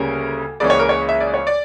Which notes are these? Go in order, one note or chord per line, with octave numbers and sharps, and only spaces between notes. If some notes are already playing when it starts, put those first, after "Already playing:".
Already playing: D2 C#3 G3 A#3 C#4 A#4
C#2 C#3 E3 A#3 C#4 D5
C#5
A#4
C#5
E5
D5
C#5
D5